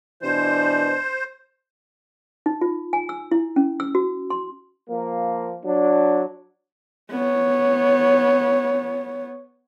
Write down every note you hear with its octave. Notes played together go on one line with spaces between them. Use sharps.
B2 E3 D4 C5
D#4
F4
G#5
E6
E4
C#4
E6
F#4
C6
F3 A#3
F#3 D4
B3 C#5